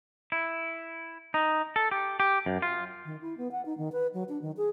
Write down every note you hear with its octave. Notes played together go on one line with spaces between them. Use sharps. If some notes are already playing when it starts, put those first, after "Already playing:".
E4
D#4
A4
G4
G4
F#2
F4
D#3
E4
B3
F#5
D#4
D#3
B4
F#3
D4
D#3
G#4